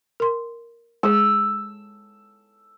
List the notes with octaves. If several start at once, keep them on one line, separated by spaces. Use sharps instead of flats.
A#4 C6
G#3 G#4 E6